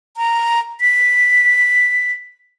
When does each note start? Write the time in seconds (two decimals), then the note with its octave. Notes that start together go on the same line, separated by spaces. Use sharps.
0.17 A#5
0.81 B6